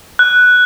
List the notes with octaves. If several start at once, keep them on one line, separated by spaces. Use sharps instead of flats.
F#6